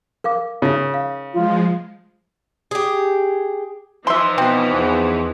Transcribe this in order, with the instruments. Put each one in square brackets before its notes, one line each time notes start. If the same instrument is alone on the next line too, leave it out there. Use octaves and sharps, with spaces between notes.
[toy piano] A#4 F5 D6
[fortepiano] C#3 [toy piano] D#4 F4 E5
[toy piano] F5
[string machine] F3 G#3 [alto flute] F4
[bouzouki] G4 G#4
[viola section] E3 F3 D#4 [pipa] E5 C6
[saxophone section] B2 [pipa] C4
[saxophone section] E2